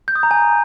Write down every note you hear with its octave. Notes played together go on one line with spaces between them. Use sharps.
G6
D#6
A#5
G#5